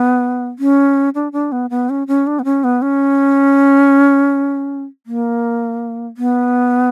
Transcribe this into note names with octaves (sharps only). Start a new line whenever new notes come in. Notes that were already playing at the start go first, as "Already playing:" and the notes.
Already playing: B3
C#4
D4
D4
B3
B3
C#4
C#4
D4
B3
C#4
B3
C#4
A#3
B3